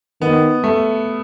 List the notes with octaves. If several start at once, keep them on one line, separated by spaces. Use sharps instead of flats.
D#3 B3
A3